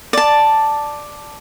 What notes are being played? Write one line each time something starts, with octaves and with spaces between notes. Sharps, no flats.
D5 A5